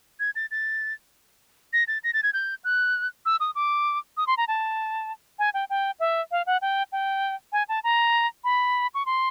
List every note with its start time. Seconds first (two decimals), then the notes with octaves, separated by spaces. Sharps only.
0.20 G#6
0.35 A6
0.51 A6
1.73 A#6
1.88 A6
2.04 A#6
2.14 A6
2.23 G#6
2.33 G6
2.64 F#6
3.26 E6
3.40 D#6
3.55 D6
4.17 D#6
4.27 C6
4.37 A#5
4.48 A5
5.39 G#5
5.54 G5
5.70 G5
6.00 E5
6.31 F5
6.46 F#5
6.62 G5
6.92 G5
7.52 G#5
7.69 A5
7.84 A#5
8.44 B5
8.94 C#6
9.06 C6